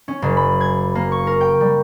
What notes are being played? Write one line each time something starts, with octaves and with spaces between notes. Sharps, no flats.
C#4
F#1
B5
G#6
A#3
C#6
A#4
G5
G3